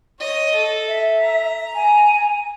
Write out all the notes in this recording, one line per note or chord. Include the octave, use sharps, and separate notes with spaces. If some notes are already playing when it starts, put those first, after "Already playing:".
C#5 D#5
A4
E5
A#5
G#5